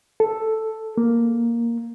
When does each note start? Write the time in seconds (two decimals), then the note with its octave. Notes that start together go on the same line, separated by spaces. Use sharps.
0.20 A4
0.97 A#3